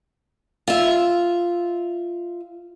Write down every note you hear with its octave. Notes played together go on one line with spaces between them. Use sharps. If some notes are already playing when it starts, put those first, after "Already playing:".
F4 E5